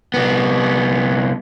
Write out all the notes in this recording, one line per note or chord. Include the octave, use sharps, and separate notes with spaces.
C2 B3